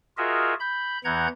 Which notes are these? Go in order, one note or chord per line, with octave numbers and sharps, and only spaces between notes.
F4 F#4 G#4 A#4 D#5 E5
B5 G6
E2 E3 F#5 A#5 G6 G#6